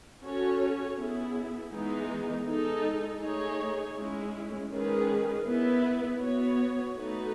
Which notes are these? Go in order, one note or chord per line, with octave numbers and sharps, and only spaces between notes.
C#4 F#4 A4 C#5
B3 E4 G#4
E3 G#3 B3 D#4
G#3 D#4 A4
A3 D#4 G#4 C#5
G#3 C#4 E4
D#3 G#3 C#4 G#4 B4
B3 E4 B4
B3 F#4 C#5
A3 D#4 F#4 B4